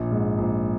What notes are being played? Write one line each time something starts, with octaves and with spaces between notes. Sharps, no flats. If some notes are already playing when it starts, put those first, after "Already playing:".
Already playing: A#1
G#2
A#1